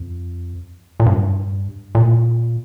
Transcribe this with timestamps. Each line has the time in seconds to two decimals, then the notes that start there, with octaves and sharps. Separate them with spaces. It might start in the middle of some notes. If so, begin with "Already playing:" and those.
Already playing: F2
1.00 A#2
1.06 G2
1.95 A#2